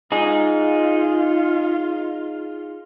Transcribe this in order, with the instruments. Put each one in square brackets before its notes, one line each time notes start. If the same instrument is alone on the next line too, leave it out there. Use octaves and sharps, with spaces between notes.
[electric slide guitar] D#4 G#4 [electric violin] F4